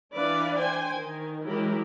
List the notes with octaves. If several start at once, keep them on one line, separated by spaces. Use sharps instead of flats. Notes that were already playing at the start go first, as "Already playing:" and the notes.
E3 D4 B4 D5 F5
C5 G5 G#5
D#3
E3 F#3 G#3 G4 A#4 B5